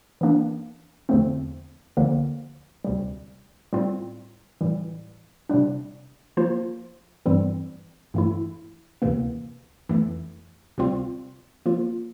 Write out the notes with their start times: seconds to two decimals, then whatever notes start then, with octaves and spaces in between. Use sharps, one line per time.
0.21 E3 A#3 D4
1.09 E2 D3 F3 A3 C4
1.97 D2 D3 F3 A#3
2.85 D2 C3 G3
3.73 A2 G3 C4 F4
4.61 A2 E3 G3
5.49 C3 G3 D4
6.37 F3 A#3 F4 C5
7.26 G2 E3 G3 C4
8.14 G2 E3 A3 E4
9.02 D2 C3 E3 A#3
9.89 F2 E3 A3
10.78 D2 C3 G3 C4 F4
11.66 F3 A#3 F4